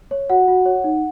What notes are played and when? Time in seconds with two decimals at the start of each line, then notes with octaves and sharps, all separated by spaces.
0.11 C#5
0.30 F#4 F#5
0.48 F#4
0.65 C#5
0.84 D#4